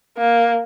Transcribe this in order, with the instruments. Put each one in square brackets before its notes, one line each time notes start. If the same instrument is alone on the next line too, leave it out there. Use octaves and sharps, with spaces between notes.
[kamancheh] A#3